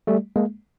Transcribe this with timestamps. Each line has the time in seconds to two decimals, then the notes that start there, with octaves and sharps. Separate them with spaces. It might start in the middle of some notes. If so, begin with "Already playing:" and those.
0.07 G3 A3
0.36 G#3 A#3